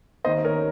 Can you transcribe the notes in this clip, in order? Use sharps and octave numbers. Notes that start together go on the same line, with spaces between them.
D#2 D#3 C5 D#5
A#4 C#5